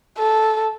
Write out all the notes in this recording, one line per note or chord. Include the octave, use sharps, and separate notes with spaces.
A4